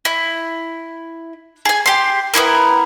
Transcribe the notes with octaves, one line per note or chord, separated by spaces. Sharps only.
E4
G#4 G#5
G4 C6
B3 D4 E4 A#4